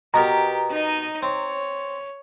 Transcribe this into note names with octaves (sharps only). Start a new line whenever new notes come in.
B2 B3 G4 A#4 A#5
D#4 D#5
C4 C#5